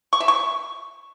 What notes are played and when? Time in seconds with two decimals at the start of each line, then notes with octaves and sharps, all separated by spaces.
0.13 C#6
0.20 E5
0.28 C#6